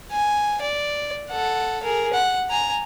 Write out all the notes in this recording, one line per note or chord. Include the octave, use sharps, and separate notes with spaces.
G#5
D5
A4 F#5
G#4 A#4
F#5
G#5 A#5